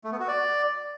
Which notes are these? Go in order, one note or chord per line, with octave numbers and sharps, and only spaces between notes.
A3
B3
F#4
D5